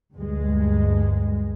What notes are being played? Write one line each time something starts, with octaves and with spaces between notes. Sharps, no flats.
D2 G2 G#3